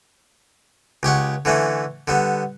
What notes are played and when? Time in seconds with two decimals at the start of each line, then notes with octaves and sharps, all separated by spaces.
1.03 C#2 G4 C#5 F#5
1.45 D3 E3 A3 C#4
2.08 D3 G3 B3